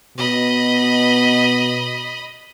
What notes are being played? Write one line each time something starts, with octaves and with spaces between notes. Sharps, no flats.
B2 D#5 B5